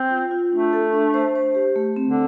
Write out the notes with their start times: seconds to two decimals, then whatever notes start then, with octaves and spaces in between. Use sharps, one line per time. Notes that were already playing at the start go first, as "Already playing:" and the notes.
Already playing: C4
0.10 F4
0.31 F4
0.52 A3 D4
0.73 A4
0.93 D4
1.14 C5
1.35 C5
1.55 G4
1.76 A3
1.96 C4
2.07 D3